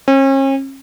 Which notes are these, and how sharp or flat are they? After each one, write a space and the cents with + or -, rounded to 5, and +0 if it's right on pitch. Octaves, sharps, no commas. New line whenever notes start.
C#4 -40